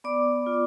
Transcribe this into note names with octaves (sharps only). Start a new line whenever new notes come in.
B3 D5 D6
F4